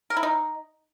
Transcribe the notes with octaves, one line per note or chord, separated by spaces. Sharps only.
A#4
E4
D#4